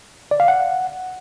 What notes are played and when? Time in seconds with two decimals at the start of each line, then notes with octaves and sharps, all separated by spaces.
0.31 D5
0.40 F5
0.48 F#5